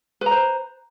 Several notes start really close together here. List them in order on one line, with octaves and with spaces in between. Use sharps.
B4 A#5 C5